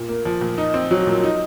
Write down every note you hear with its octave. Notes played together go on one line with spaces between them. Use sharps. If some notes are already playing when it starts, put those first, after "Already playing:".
Already playing: A#2
A#3
F3
A#2
D#4
C4
F#3
A#2
D#4